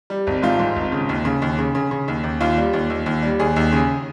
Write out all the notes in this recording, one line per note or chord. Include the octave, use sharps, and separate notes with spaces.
G3
G#1
G#2 F4
G#2
G#1
C#3
D#2
C#3
D#2
C#3
C#3
C#3
D#2
D#2
D#2 F4
G3
D#2
D#2
D#2
G3
D#2 G#4
D#2
C#3